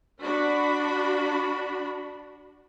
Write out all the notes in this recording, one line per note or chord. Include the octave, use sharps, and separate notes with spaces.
D4 F#4 B5